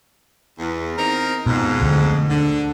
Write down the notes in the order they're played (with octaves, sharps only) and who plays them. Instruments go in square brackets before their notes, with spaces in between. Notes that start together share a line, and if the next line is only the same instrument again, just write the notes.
[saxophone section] E2
C4 D#4 A#4
[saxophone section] F2 G#2 [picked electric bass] B2
[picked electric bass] D2
[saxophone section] D3